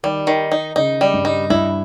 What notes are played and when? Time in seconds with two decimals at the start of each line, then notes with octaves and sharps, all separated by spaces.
0.03 D#3 G3
0.27 D#3
0.52 D#4
0.76 C#3 D#4
1.01 G3
1.13 G2
1.25 D#4
1.50 G2 E4